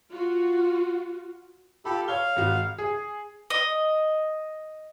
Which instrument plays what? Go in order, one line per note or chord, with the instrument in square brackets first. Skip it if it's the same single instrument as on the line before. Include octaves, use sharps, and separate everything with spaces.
[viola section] F4 F#4
[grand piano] F4 B5 [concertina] G4 A4
[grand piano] C#5 G7 [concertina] F5
[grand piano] G#1 F#4
[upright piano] G#4
[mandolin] D#5